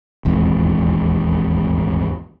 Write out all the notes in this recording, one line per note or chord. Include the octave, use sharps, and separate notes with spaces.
D#1 G#1 E2 G#2